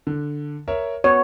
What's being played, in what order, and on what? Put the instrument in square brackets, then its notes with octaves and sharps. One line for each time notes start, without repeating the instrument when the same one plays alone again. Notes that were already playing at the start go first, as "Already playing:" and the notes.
[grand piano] D3
A#4 C#5 E5
[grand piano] B3 F#4 [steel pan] C#5